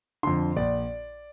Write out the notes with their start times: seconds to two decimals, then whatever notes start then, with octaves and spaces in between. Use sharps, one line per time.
0.23 F2 D3 C6
0.56 A#1 D5